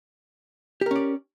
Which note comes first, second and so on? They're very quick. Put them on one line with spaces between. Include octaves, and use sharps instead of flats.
G4 A#4 C#4 D5